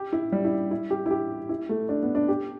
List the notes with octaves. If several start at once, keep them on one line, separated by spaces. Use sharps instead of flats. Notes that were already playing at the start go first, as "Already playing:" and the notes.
Already playing: G4
E4
G3
E4
E4
G4
E4
G4
E4
A3
D4
B3
D4
G4